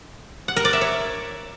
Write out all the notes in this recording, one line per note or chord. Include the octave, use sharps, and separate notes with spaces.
F#5
A#4
D5
E5
C#5